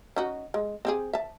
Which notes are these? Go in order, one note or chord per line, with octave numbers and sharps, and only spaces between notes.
C#4 D#4 F#4
G#3
C4 G4 G#4
E5 A5